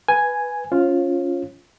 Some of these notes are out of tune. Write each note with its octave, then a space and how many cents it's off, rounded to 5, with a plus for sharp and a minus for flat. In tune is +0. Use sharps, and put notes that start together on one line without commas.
B4 +0 G#5 +0
C#4 +10 F4 +0 C#5 -35